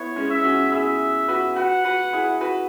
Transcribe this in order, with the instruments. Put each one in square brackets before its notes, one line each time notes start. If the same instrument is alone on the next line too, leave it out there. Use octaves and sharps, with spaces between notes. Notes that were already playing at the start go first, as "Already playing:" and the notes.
Already playing: [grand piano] B3 E4 [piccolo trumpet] C#5
[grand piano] G#3 C#4
[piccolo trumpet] E5
[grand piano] C#4 F#4
[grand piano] E4 G#4 [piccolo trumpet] E5
[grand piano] F#4 B4
[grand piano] F#4 B4 [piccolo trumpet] F#5
[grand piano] F#4 B4
E4 G#4
F#4 B4